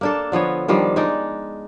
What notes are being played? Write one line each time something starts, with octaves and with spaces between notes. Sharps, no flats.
A#3 D4 A4
D3 F3 B3 C#5
D#3 F3 G3 D4
G#3 D4 D#4 D5